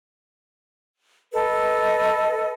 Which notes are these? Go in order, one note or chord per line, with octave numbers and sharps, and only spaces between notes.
A4 B4 D#5